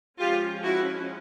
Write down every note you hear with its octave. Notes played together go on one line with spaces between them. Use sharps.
F3 G#3 C#4 F4 G4
E4 F#4